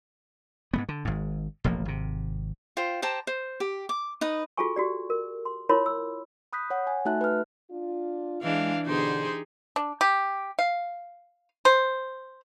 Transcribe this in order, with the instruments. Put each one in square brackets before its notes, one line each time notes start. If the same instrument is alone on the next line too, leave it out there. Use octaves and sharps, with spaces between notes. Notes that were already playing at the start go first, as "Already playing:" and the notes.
[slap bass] G#2 G#3 B3
D3
G#1 G#2
E1 A1 F3 A#3
G#1 C3
[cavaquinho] F4 C5 G5
G4 C5 A5 A#5
C5
G4
D6
D#4 B4 D#6
[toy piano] F4 F#4 G#4 A4 G#5 C#6
F#4 G4 D5
A#4
C6
E4 F4 A#4 C#5 B5 C6
E6
[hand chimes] B5 D#6 F#6 G6 B6
C#5 F#5
G#5
A3 D#4 F#4 E5 A5 F#6
B4 F6
[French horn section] D4 F4
[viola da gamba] E3 D4 [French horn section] G#3 [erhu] F5
[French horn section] B2 D3 [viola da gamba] D#4 G4 G#4 [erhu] C5
[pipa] D4
G4
F5
C5